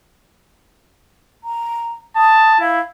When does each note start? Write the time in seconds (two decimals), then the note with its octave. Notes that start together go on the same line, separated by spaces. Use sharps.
1.44 A#5
2.16 A5 D#6
2.60 E4 F5